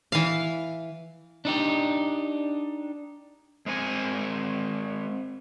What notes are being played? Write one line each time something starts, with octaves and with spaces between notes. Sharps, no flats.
E3 F5
D4 D#4 G4
G#3 C4 G#5